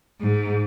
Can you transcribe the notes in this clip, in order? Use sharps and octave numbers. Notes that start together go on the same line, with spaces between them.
G#2